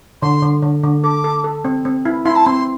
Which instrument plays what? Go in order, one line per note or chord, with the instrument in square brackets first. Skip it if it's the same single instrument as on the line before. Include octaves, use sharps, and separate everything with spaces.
[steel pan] D3 [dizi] C6
[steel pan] D3
D3
D3
[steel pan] A4 [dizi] D6
[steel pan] A4
A4
C4
C4
E4
[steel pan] E4 [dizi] C6
[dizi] A5
[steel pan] C4 [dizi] C6